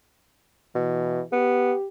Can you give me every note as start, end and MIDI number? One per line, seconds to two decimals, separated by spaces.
0.75 1.21 47
0.75 1.26 52
1.32 1.73 59
1.32 1.88 67